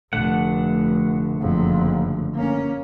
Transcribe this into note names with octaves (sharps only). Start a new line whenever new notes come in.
F1 D3 A3 F#5
F#1 F2
A#3 C#4